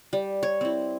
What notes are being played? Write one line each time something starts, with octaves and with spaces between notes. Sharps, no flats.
G3
C#5
C4 E4